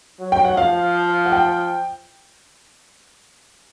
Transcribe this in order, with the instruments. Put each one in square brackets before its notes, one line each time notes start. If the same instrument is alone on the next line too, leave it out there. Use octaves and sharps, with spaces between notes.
[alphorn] F#3
[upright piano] G5
F#5
[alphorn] F3 [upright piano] F5
[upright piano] F#5
G5